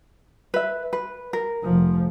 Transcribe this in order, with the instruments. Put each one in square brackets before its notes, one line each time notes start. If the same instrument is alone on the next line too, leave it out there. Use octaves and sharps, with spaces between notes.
[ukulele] B4 E5
B4
A#4
[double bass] F1 F3